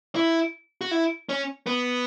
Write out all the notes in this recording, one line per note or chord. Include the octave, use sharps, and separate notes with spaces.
E4
F#4
E4
C#4
B3